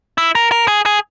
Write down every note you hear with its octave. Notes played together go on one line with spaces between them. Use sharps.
E4
A#4
A#4
G#4
G#4